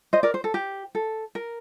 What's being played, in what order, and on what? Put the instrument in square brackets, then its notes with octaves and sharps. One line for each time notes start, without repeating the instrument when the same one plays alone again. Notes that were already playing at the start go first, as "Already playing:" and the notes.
[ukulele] C5 D#5
A#4 D5
C5
A4
G4
A4
A#4